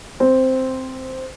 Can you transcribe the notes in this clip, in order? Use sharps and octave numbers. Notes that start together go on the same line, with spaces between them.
C4